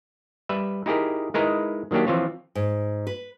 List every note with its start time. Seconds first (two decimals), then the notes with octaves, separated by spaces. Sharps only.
0.49 G3 B4 E5
0.86 D#4 E4 G4 G#4 A#4
1.34 G#3 D#4 E4 G#4 A#4 B4
1.91 D#3 F#3 A#3 D4 G4
2.07 E3 F3 C4 F4 C#5
2.55 G#2
3.07 B4